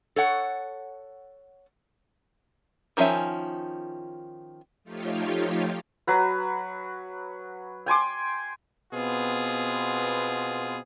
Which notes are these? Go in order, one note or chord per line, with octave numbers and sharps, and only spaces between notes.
A4 C#5 F#5
D#3 F3 C#4 E5 G#5
F3 A3 D#4 F4 G4 C#5
F#3 B4
G5 G#5 C6 D6
B2 B3 C4 F4 G#4